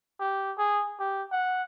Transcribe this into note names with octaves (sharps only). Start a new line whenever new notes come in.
G4
G#4
G4
F#5